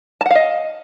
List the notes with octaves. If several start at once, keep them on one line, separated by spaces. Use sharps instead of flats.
D#5 F5 F#5 A5